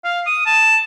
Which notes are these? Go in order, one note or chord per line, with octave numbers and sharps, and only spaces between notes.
F5
D#6
A5